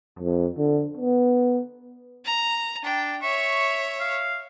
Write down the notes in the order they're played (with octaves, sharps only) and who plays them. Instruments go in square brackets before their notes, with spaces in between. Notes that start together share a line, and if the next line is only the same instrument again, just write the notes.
[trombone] F2
D3
B3
[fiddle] A#5
[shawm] D4 [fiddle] G5
[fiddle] C#5 E5 [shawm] C#6
[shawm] F5